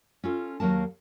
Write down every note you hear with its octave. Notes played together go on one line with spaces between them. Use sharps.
C#4 F4 A4
D#2 F#3 A#3 A#4 A5